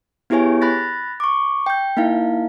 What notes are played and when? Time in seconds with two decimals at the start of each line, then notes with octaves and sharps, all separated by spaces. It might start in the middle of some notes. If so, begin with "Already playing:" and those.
0.30 B3 E4 G4 G#4 C#5 G#5
0.61 B5 F#6 A6 A#6
1.20 C#6 D6
1.66 G5 G6
1.97 A#3 D#4 E4 F5